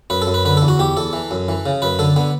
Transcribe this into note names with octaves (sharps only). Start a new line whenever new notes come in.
F#2 B4
A4
F#2
B4
D3 B4
A4
E2
F#4
E2 G4
E2 A4
E3
F#2
E3
C#3
F#2 B4
D3 A4
D3 B3